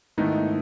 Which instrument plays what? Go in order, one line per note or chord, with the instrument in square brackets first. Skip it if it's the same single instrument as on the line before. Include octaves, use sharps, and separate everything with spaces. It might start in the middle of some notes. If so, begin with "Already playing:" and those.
[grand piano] G#2 D#3 A3 E4 [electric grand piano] B3 D#4